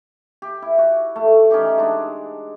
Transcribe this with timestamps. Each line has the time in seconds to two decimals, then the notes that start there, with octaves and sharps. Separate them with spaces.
0.42 G4
0.62 E4
0.78 F#4
1.16 A3
1.51 E3 C#4 D#4 G4
1.78 G#3 D4